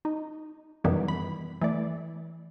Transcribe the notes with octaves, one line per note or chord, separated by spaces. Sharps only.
D#4
F#2 C3 D#3 E3 G3 B3
B5
E3 A3 D5